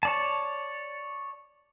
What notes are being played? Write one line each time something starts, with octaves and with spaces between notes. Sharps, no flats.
C#5 D5 A5